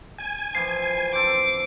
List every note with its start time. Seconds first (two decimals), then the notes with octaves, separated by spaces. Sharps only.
0.18 G#5
0.55 E3 F3 C7
1.13 C4 A4 C5 D6